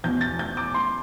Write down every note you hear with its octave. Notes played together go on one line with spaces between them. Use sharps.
E2 B2 G6
A6
G6
D6
C6